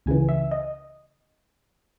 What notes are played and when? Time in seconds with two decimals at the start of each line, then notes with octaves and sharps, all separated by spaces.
0.06 C#2 C#3 E3 G#5
0.29 E5
0.51 D#5